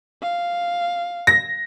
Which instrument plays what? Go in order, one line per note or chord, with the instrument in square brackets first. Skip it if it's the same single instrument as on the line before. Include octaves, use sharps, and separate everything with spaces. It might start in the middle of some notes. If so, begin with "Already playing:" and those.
[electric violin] F5
[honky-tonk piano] A#6